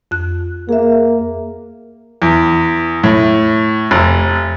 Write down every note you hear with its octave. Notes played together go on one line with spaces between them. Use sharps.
F2 F#6
A#3 G#4 E5
E2
A2
F1